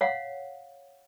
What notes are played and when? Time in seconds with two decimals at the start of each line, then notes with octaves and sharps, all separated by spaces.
0.01 C#5 F5 F#5